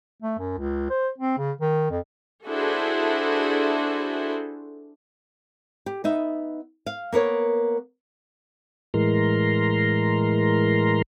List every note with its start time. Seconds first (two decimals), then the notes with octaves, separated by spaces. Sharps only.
0.22 A3
0.39 F#2
0.58 C#2
0.90 C5
1.18 C4
1.38 C#3
1.61 D#3
1.90 F2
2.46 D4 E4 F#4 G#4 A4 C5
5.86 G4
6.04 B3 D#4 E5
6.86 F5
7.12 A#3 B3 A#4 C#5
8.94 A2 E3 G#3 A#4 A#5 C6